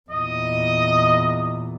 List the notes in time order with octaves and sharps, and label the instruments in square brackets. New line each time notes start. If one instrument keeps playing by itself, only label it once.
[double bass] E2 A#2 [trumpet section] D#5